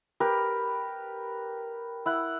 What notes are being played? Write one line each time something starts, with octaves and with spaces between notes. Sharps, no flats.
G4 A#4 B4
E4 F#5